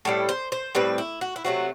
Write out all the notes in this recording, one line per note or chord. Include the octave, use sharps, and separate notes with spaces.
A2 G3 C4 A4
C5
C5
A2 G3 C4 B4
E4
F#4
E4
C3 F#3 A3 C4 F#4